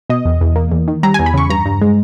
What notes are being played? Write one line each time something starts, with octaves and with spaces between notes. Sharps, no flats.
B2 D#5
E2
E2
A#3
E2
D#3
G3 A#5
E2 G#5
B5
C#3 C#6
G2 A#5
G2
G#3